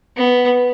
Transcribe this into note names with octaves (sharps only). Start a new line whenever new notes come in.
B3